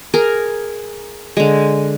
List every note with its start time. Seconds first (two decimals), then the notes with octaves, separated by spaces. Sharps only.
0.14 G#4 A#4
1.37 D3 G#3